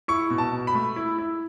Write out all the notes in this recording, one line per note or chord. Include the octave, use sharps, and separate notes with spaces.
E4 C#6
B2
A5
B2
B5
A3
E4
E4